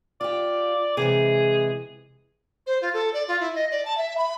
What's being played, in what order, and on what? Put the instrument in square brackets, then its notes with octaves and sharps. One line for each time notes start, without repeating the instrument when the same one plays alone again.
[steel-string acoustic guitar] F4 G4 [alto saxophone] D5
[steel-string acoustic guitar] C3 E3 G#3 [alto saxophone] G#4
[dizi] C5
F4
A4
D5
F4
E4
D#5
D5
A5
E5
B5